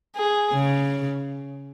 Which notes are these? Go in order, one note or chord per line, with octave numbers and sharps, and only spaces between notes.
G#4
C#3